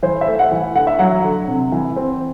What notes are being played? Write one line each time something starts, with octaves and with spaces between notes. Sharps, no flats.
E3 C5
E5
A3
F#5
E3
D3 F#5
E5
F#3 F#5
D3
C3
E3
C4